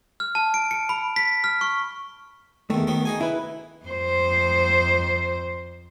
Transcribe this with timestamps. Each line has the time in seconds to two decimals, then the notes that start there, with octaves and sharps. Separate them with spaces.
0.20 F6
0.35 A5
0.54 D7
0.71 C#7
0.89 B5
1.16 B6
1.44 F6
1.61 C#6
2.70 E2 D#3 A3
2.87 D#3 F#3 B3
3.05 D#4 G#4 G#5
3.21 E4 B4
3.86 F2 C5